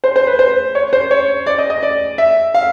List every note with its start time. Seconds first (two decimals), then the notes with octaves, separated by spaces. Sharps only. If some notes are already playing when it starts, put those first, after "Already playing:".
0.04 C5
0.16 C5
0.27 B4
0.39 C5
0.75 C#5
0.93 C5
1.11 C#5
1.46 D5
1.58 D#5
1.70 D#5
1.83 D5
2.18 E5
2.54 F5